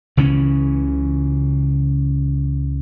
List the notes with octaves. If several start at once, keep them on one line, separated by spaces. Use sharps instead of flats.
C#2 C#3 E3 C#4